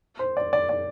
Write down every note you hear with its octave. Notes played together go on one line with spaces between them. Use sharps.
C5
D5
D5
D5